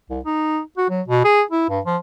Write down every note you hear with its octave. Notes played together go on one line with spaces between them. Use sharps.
C2
D#4
F#4
F#3
B2
G#4
E4
G2
F3